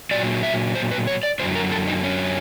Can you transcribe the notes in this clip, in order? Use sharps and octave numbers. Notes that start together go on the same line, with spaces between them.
A#2 F#3 D5
E5
C5
B4
C#5
D5
F#2 D3 F#3 C5
A#4
A4
D#4
C#4